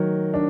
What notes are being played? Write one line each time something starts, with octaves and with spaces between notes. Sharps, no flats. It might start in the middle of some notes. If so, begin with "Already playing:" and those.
Already playing: D#3 F#3
D4